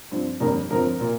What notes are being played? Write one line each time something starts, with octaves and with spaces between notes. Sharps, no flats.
G2 F3 C4
G1 F2 D#3 G3 A#3 A#4
G1 F2 F3 C4 A#4
A#2 A#3